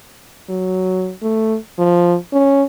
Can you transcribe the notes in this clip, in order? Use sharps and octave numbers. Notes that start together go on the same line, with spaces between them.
F#3
A3
F3
C#4